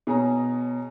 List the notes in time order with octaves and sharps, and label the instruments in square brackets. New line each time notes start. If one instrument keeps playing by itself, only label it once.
[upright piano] B2 G#4 C#5 A#5